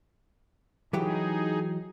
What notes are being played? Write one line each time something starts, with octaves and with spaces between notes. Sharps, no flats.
E3 F#3 D#4 G4 G#4